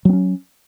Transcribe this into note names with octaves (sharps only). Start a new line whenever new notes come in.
F#3 C4 C#4